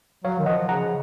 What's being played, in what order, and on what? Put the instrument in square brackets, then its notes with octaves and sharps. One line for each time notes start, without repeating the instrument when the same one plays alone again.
[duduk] F#3 [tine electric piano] C#5 F5
[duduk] D#3
[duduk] F3 [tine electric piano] D#5 F#5
[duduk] C#3 [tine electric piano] F#5 A#5